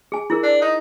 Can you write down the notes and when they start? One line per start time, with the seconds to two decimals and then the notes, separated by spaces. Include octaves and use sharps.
0.12 G#4 G#5
0.30 E4 G#4 A#4
0.43 D4
0.62 D#4